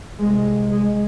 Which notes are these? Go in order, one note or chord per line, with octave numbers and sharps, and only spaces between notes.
C2 C3 G#3
G#3